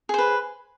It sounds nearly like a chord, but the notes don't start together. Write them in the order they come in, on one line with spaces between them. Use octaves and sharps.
G#4 C5 B4